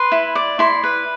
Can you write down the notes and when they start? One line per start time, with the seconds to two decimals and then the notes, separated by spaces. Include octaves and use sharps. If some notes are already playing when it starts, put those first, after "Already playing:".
Already playing: B4 C6
0.12 E4
0.35 D5
0.59 E4 C6
0.84 B4